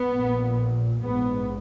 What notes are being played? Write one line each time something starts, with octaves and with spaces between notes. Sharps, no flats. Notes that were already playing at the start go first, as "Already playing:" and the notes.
Already playing: B3
A#1 A#2
A#1 G#2 B3